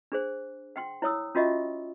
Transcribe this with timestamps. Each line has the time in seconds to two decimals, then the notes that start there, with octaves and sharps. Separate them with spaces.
0.12 D4 G#4 C5
0.76 F#5 G5 C6
1.02 E4 C#5 D#6 E6
1.35 C#4 F4 F#4 D#5 E5 C#6